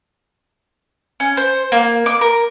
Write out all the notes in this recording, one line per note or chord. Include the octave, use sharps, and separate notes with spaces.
C#4
C5
A#3
D6
A#4